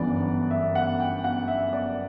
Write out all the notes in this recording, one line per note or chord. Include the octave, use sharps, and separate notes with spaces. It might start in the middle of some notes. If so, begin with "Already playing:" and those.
Already playing: G1 F#2 E3 B3 D4 D5
E5
F#5
G5
F#5
E5
D5